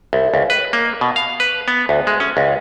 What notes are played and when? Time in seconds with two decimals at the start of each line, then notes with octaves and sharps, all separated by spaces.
0.13 C2
0.34 C#2
0.50 B4
0.73 A#3
1.01 B2
1.16 F5
1.40 B4
1.68 B3
1.89 D2
2.07 G#3
2.20 C#4
2.37 C#2